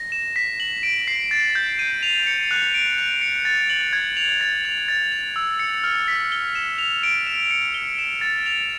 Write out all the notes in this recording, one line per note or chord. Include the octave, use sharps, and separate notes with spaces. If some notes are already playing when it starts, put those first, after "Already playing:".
Already playing: A#6
E7
B6
F#7
D7
C7
A6
G6
D#7
F7
C#7
F#6
D7
F7
C#7
A6
F#7
G#6
F7
A6
F7
A6
F7
E6
C#7
F6
B6
G7
E7
F7
D7
E7
C#7
G7
E7
A6
F7